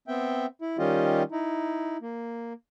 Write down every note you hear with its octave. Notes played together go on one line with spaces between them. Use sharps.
B3 C4 E5 G5
E4
D#3 G3 C#4 F4 G4 D#5
D#4 E4
A#3